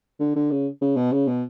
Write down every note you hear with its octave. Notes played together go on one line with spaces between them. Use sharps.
D3
D3
C#3
C#3
B2
C#3
B2